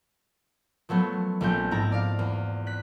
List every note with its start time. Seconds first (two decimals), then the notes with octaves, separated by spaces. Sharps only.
0.89 F3 F#3 A3 B3
1.41 A#1 F3 A3 C4 G6
1.71 G#2 E4 A5 A#5
1.92 D5 F5
2.19 E2
2.67 F#6 B6